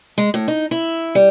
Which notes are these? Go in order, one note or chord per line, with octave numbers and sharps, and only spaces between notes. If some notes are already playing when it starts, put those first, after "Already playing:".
G#3
A2
D#4
E4
G3